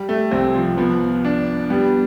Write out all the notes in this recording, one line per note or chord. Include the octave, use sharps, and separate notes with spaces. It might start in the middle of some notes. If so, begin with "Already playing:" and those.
Already playing: G3
A3
C2 C4
F3
F3 B3
D4
G3 B3